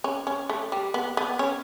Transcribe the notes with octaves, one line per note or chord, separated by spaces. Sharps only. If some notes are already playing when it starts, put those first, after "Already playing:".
C#4
C#4
A3
G3
B3
B3
C#4